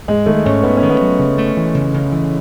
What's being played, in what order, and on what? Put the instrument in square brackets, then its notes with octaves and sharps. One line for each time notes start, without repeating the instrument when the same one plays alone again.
[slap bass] G#2 [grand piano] G#3
[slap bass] D#3 [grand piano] A3
[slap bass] G#2 [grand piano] C#4
[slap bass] G#2 [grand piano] B3
[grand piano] C#4
[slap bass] D#3
[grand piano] B3
[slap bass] F#3
C#3
A3
E3
C#3
C#3
E3